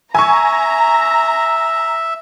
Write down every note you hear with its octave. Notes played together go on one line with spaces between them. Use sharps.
E5 G#5 A#5 C#6